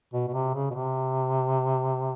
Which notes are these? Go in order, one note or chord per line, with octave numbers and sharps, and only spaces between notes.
B2
B2
C3
C#3
B2
C3